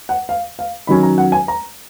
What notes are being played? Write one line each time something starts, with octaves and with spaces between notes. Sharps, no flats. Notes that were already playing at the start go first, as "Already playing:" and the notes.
F#5
F5
F5
D#3 F#3 C#4 B5
A#5
F#5
G#5
A#5